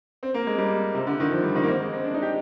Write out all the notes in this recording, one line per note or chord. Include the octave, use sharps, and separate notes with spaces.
C4
A#3
G#3
G3
C3
D3
D#3
F3
G3
D#3
A#3
C4
G#3
C4
D4
D#4
G4